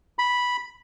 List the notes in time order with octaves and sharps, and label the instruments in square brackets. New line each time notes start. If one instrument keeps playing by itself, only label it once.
[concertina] B5